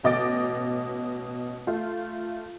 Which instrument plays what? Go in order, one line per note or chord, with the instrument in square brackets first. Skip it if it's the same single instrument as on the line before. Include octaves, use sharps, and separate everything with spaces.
[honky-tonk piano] A1 B2 D#5 D6 A6 D7
A3 F4